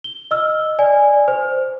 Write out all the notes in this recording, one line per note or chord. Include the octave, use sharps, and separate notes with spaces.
G7
D#5 E6 F6
D5 G#5
C5